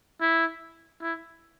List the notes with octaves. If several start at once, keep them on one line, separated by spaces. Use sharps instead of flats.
E4
E4